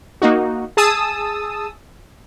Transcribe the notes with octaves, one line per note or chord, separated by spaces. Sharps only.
A#3 D#4 F#4
G#4 A5 D#6 E6